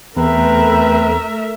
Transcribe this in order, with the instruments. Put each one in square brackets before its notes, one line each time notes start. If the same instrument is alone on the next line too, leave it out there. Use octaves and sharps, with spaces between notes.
[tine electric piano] E2 [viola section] A3 A#4 E5 [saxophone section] C4 B4 [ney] A#5